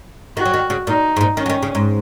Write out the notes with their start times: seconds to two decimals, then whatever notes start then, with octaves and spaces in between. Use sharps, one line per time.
0.37 D#3 F#4
0.46 F#3
0.54 D#3
0.70 C#3
0.87 A#2 D#4
1.16 G#2
1.21 A#2
1.37 D#3 C#4
1.46 F#3
1.50 D#3
1.63 C#3
1.75 G#2